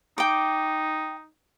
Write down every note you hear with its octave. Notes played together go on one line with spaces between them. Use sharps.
D#4 G5 D6